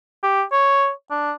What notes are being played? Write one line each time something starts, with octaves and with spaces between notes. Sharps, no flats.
G4
C#5
D4